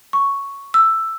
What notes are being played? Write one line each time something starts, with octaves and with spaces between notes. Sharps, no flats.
C#6
E6